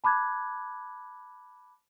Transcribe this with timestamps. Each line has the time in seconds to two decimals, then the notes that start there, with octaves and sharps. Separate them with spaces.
0.04 A5 B5 D6 F#6 G#6